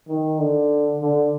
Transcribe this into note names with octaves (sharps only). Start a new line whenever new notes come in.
D#3
D3
D3